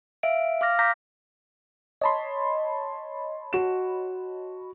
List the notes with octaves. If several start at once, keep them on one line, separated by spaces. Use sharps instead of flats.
E5 F5 D7
F5 D6 F6 A#6
A#5 D6 G6 A#6 B6
C#5 D#5 A5 B5 C6
F#4 E7